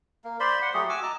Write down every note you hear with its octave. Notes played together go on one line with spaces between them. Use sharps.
A#3
C5 D5 B5 C6
F#5 C6
F#3 A3 G4 G#4
F#4 G#5 D6 E6
D#5 A5 A#5 D6